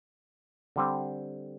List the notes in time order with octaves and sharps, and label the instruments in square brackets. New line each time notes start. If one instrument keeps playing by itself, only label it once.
[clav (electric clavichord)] D3 G3 C4